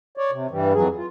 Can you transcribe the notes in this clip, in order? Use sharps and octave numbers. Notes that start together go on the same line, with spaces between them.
C#5 D5
C3
G2 E3 G3
F2 E3 F#3 G#4
F4